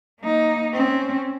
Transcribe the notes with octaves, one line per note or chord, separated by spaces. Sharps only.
A#3 D#4
C4 C#4